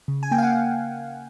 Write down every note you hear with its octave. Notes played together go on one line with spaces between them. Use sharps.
C#3
G#5
A#3 G5
F5
F#5